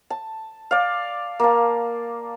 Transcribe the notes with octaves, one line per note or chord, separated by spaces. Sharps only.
A5
D5 F5
A#3 A5